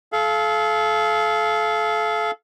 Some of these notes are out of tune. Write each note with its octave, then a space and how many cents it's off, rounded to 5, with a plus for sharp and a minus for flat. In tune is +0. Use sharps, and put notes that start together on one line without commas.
A4 -35 F5 -20